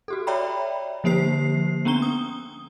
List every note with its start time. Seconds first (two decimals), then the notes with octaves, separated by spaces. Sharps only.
0.08 F#4 G4 A4
0.27 C#5 D5 E5 G5 A#5 B5
1.04 D3 F3 A#3 G4 C5 C7
1.85 B3 C#4 D4 A#5 G7
2.02 D#6